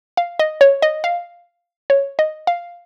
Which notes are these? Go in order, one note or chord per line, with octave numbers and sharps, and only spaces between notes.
F5
D#5
C#5
D#5
F5
C#5
D#5
F5